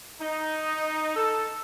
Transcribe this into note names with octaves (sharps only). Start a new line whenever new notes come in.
D#4
A4